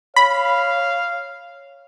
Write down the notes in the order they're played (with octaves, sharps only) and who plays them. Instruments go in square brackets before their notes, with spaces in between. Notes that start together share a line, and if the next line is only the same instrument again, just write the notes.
[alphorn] C#5 [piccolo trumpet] F5 [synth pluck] B5